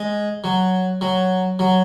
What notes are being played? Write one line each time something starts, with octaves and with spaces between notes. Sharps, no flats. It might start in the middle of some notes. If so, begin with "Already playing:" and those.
Already playing: G#3
F#3
F#3
F#3